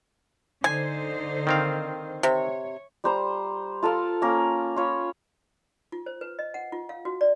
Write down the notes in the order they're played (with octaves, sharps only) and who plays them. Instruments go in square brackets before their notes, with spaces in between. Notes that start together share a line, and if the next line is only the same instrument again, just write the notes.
[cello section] D3 D#4 C5 [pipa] G#5
[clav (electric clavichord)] D#3 C4 F5
[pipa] C3 [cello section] C#5
[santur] G3 C5 A#5
F4 A4 A#4 F5
A#3 C#4 A#4
F4 C#5 B5
[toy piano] F4
C5
B4
D#5
F#5
F4
F5
F#4
D5